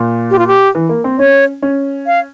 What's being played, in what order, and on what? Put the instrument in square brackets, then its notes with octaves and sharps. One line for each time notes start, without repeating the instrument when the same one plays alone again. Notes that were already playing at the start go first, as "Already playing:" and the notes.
Already playing: [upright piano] A#2
[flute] G4
F4
G4
[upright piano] E3
A#3
C4
[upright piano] C#4 [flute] C#5
[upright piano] C#4
[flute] F5